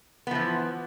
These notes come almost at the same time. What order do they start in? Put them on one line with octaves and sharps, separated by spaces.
B3 F3 E3